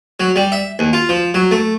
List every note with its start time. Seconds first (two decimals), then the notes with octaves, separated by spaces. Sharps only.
0.20 F#3
0.36 G3
0.52 E5
0.79 D#2
0.93 F4
1.09 F3
1.34 F#3
1.51 A3